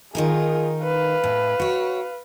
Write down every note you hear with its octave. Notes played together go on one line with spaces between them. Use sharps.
D#3 D#4 F4 G#4 A#4
B4 F5
A2
F#4 C#5